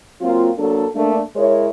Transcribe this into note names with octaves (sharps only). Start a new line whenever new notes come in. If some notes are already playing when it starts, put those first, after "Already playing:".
F#3 A#3 C4 F4
F#3 A#3 D4 A4
A3 A#3 D4
G#3 E4 A#4 C#5